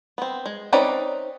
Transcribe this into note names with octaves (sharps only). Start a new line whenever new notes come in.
B3 C4
G#3
C4 C#4 D#4 B4 D5